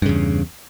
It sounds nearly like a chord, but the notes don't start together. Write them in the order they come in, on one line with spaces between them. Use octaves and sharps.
G2 C#3 E2